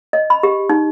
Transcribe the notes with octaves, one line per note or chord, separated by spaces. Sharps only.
D#5
B5
G4
D#4